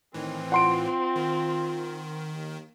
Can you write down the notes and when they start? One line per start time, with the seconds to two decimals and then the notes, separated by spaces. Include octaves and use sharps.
0.14 A2 D#3 E3 C4
0.52 F4 F#5 C6 D7
1.16 D#3
2.35 D#2